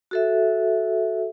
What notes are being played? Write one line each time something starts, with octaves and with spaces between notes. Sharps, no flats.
F#4 A4 E5